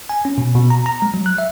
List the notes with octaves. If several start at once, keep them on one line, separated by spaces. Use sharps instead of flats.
G#5
C#4
B2
B2
A#5
A#5
G#3
F#3
F#6
E5